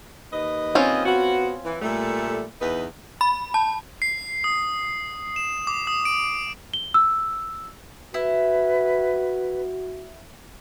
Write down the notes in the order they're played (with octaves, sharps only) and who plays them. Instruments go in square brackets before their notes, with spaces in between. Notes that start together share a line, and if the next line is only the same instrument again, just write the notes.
[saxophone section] D#2 B4 D#5
[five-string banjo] C4 C#4 F4
[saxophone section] B3 F#4
E3
A#2 G3 A3
E2 D#4 B4
[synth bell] B5
A5
[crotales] C7
D#6
E7
D6
D#6
D7
[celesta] G7
E6
[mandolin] E4 [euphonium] F#4 [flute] B4